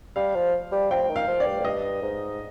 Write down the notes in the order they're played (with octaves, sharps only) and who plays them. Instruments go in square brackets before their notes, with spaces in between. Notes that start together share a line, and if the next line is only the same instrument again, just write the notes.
[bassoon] G3 [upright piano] F5
[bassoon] F3
G3
[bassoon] F3 [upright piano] G5
[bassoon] D#3
[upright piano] F5
[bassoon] F3
[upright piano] D5
[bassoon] G2
F2
[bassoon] G2 [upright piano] D#5
[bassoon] G#2